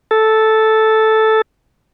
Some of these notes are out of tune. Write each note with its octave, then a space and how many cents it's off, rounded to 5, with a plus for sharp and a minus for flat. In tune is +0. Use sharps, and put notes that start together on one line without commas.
A4 -5